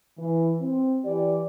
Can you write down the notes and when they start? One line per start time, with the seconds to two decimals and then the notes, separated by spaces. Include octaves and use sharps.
0.18 E3
0.61 C4
1.05 E3 G4 D5